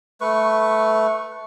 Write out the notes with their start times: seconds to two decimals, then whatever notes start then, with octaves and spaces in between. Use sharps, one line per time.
0.21 A3 B4 C#6